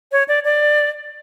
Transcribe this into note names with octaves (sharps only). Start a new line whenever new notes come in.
C#5
D5
D5